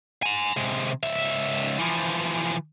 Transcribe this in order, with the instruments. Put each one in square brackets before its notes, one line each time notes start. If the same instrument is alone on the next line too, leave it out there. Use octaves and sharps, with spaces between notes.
[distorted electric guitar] G#5 A#5
C3 G#3
C#2 E5
E3 F3